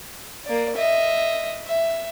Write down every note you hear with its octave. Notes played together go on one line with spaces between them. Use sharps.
A#3 D5
D#5 E5
E5